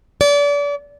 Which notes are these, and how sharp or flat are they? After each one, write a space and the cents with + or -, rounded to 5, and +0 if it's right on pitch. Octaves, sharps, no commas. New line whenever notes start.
D5 -35